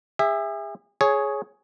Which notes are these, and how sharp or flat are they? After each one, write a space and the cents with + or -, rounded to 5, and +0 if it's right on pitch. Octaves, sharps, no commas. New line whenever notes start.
G#4 -40 E5 +0
G#4 +10 C#5 +0